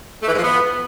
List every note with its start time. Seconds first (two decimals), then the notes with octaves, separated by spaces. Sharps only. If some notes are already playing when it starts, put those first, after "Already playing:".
0.23 A3
0.28 E3
0.33 G#2
0.39 F3
0.44 B3